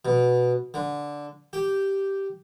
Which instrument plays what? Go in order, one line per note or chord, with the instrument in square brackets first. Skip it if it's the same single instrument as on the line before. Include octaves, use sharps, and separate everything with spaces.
[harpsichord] B2
D3
G4